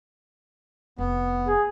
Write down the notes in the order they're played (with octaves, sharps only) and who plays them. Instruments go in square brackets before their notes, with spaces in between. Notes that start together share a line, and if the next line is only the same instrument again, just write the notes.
[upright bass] F1 [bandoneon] B3
[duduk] G#4